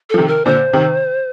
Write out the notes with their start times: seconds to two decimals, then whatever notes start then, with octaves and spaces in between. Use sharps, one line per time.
0.10 F3 A4
0.18 C3 D#3
0.28 A#4
0.45 A#2 D3 C5
0.73 C3 D#3